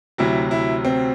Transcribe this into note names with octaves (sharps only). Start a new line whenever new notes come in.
D2 C3 F#3 E4
E4
C4